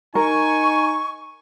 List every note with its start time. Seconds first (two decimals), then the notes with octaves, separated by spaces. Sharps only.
0.15 D#4 A#4 G#5 C#6